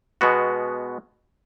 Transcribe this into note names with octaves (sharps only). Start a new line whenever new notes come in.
B2 G#3 B3 F#4